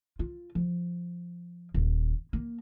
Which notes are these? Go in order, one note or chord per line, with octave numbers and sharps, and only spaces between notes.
F4
F3
D#1
A#3